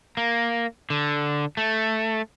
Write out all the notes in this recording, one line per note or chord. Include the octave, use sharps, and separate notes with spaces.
A#3
D3
A3